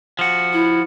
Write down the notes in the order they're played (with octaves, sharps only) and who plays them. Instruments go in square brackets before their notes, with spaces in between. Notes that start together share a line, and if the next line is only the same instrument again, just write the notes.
[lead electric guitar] F3 F#4
[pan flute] E4